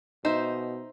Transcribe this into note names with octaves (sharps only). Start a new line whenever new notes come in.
B2 D#4 C5 E5